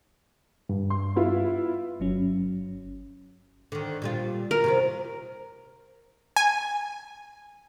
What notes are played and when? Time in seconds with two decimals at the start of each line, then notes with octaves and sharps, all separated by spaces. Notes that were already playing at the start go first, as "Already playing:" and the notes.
0.69 G2
0.90 C6
1.16 B3 E4 F4
2.00 G1 F#3 C#4
3.72 D3 D#3
4.02 A#2 G3 F4
4.51 A#4
4.64 C3 D#3 F4
6.36 G#5